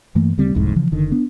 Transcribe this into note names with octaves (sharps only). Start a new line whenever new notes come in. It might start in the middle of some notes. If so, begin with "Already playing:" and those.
G2 E3 A3 A#3
D2 C#3 G3 C4
E1 C2 F2 G#2
C#3 E3 F3
F#1 D3 D#3
B3 D4